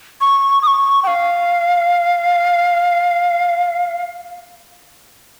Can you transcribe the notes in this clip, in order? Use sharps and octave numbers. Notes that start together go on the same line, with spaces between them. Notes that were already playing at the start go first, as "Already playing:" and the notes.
C#6
D#6
C#6
G5
F5